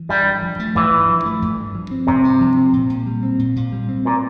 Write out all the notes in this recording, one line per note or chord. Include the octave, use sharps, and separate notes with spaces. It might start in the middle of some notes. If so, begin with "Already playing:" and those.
Already playing: E3
G2 G3
G2
F3
A3
G2 E3
G2
F3
A3
G2
G2
F3
C4
G2 C3
G2
F3
C4
A#2
A#2
G3
C4
A#2
A#2
G3
C4
A#2